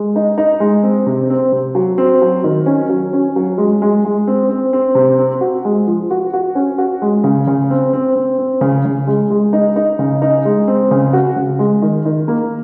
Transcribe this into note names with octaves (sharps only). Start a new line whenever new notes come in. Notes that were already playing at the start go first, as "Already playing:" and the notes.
Already playing: G#3
D#4
D#4
G#3
C4
C3
C4
C3
F#3
C4
F#3
D#3
C#4
F#3
C#4
F#3
G#3
G#3
G#3
C4
C4
C4
C3
C4
F#4
G#3
F3
F#4
F#4
C#4
F#4
G#3
C#3
C#3
C4
C4
C4
C4
C#3
C#3
G#3
G#3
D#4
D#4
C#3
D#4
G#3
C4
C#3
F#4
C#3
G#3
D#3
D#3
A#3